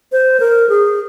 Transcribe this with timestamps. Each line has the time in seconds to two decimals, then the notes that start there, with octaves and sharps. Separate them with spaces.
0.12 C5
0.40 A#4
0.69 G#4